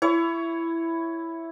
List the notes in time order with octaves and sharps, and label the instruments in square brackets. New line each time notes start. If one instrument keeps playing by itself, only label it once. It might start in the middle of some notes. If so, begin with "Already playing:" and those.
[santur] E4 C#5